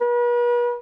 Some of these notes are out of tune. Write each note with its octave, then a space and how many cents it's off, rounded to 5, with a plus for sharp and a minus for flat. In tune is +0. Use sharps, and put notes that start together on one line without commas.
B4 -40